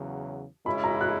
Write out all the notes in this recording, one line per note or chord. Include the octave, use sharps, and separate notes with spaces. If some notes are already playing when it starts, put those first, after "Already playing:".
Already playing: E2 C#3 F#3
C#3 G#3 C#4 E4 B5
A#5
F#6